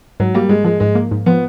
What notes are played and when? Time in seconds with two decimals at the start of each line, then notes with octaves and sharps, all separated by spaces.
0.20 G#2 F#3
0.34 G3 A#3
0.49 G#2 G#3
0.64 F3 G#3
0.80 G#2 G#3
0.95 A#3
1.11 G#2
1.26 F3 B3